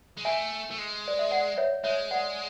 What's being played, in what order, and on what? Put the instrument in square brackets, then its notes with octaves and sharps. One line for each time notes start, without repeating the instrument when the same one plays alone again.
[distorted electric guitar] G#3
[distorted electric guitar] A3 [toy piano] E5 G#5
[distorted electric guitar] A3
G#3
[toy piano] D5
E5
D5 F#5
C#5 E5
[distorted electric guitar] G#3 [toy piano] C#5 E5
[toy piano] D5 F#5